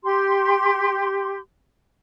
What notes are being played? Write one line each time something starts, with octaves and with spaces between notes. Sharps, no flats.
G4 C6